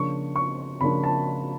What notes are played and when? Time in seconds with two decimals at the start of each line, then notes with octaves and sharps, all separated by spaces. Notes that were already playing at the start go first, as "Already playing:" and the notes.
Already playing: C#3 F3 A#3 D4 C#6
0.36 C#6
0.81 C#3 F3 A#3 D4 B5
1.04 A5